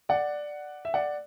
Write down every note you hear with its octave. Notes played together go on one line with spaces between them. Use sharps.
D5 F#5
E5
D5 F#5